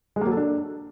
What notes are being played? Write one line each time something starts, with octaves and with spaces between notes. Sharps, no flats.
G#3
A#3
F#3
A4
D4